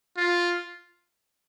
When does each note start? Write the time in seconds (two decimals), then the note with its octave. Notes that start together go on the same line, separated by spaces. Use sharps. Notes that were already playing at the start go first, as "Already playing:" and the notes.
0.17 F4